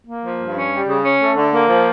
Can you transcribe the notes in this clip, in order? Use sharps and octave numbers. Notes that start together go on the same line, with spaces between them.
A#3
F3
G2
C#4
G3
C#3
C#4
A3
D3
A#3
F3